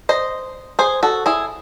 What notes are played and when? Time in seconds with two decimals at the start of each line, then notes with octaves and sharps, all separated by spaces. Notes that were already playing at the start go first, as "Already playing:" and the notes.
0.09 C5 D#5
0.79 G#4 C5
1.03 F#4 A4
1.26 E4 G#4